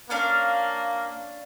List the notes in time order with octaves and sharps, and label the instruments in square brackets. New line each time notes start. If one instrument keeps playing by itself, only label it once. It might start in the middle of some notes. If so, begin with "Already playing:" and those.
[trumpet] A#3 [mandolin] C#4 D4 F5